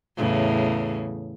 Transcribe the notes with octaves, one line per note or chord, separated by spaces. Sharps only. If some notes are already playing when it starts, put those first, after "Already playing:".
E2 A2 C#3